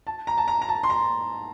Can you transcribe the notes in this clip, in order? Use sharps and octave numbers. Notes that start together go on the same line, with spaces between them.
A5
A#5
A5
A#5
A#5
A5
C6
A#5